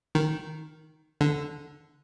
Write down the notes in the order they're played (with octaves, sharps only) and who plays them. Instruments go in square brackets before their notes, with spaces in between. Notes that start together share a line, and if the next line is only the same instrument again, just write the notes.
[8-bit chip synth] D#3
D3